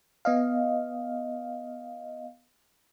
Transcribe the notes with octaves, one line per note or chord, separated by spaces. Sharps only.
B3 D#5 F5